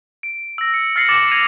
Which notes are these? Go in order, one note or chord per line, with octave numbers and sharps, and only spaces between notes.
D7
E6 A#6
C#7
F6 A6 A#6 C7 C#7 F#7
D6 A6 A#6 C#7 E7 F#7
G#6 A#6 D#7 F7